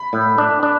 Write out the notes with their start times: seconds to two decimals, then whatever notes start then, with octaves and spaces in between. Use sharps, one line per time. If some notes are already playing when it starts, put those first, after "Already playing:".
Already playing: B5
0.13 A2
0.38 D4
0.63 D4